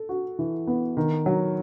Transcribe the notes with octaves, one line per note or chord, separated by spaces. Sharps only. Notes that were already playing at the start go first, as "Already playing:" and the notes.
Already playing: A4
F#4
E3
B3
D#3
F#3